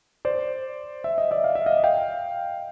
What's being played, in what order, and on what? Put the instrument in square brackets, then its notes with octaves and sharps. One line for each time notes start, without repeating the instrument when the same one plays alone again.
[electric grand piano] C5 D5
E5
D#5
D5 E5
F5
E5
D#5 F5
F5 G5